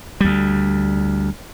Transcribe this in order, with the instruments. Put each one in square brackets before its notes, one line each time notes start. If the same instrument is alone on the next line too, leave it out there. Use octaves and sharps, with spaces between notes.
[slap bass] D2 G3